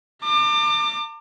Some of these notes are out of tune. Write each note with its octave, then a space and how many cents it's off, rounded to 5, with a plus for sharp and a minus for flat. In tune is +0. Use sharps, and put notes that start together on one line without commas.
A#5 -45 D6 +30